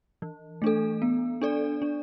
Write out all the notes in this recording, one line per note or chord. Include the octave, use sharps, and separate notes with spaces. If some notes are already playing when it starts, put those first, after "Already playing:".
E3
A3 D4 A4
B3
D4 A4 D5
D4